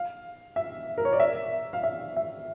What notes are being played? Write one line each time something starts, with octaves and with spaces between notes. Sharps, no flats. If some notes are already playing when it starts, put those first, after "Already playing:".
Already playing: F5
E5
A#4
C#5
D5
E5
F5
E5
E5